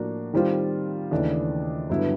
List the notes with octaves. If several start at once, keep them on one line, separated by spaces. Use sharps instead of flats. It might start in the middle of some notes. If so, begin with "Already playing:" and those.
Already playing: A2 F3 A#3 D4 F#4
D#3 G3 C4 F4
D#2 C#3 E3 A3 D4
G2 D3 F#3 B3 E4